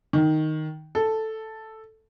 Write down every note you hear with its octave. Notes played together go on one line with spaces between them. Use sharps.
D#3
A4